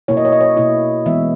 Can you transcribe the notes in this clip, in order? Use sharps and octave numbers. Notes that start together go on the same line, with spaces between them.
B2 A#3 E4 C#5
D#5
C#5
D#5
C#5
B2 A#3 E4 D#5
E3 G#3 B3 E5